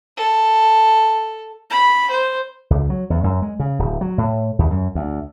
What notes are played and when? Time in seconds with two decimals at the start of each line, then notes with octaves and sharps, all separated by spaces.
0.17 A4
1.70 B5
2.10 C5
2.70 C#2
2.90 F#3
3.10 E2
3.24 F#2
3.42 G#3
3.60 C#3
3.79 D1
4.01 F#3
4.18 A2
4.59 D#2
4.71 F#2
4.95 D2